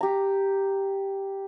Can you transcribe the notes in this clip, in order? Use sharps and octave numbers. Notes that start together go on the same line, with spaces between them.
G4 A#5